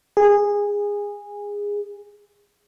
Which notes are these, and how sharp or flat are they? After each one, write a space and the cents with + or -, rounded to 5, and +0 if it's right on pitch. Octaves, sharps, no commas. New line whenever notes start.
G#4 -20